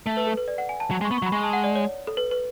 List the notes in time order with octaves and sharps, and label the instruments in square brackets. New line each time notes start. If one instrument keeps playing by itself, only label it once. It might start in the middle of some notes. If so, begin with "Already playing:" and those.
[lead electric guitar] A3
[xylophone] B4
A4
B4
D5
F#5
G#5
A5
[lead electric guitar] F#3
G#3
[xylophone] C#6
[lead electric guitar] B3
[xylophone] C#6
[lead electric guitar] F#3
[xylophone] B5
[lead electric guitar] G#3 [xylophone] C#6
[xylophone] A5
F#5
D5
C#5
A4
B4
B4